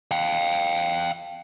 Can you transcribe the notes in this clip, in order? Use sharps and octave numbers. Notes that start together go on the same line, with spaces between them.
F5 G5